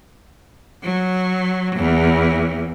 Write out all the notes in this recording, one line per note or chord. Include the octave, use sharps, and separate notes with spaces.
F#3
E2